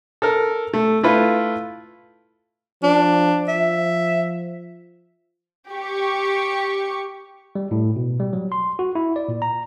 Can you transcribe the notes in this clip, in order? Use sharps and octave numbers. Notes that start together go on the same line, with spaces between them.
A4 A#4
A3
A3 E4 F4 B4
F3 D4
F3 E5
G4 C#6
G3
A2
B2
G3
F#3
C6
F#4
E4
D5
A#2
A#5